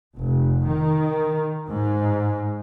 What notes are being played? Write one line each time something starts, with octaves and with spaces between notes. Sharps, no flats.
F1
D#3
G#2